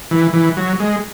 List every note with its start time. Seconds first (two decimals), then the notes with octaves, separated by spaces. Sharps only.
0.11 E3
0.33 E3
0.57 F#3
0.80 G#3